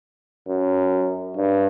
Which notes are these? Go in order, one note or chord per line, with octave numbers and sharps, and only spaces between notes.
F#2
G2